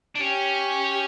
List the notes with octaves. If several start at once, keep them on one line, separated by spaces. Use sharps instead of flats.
D4
C#4 G4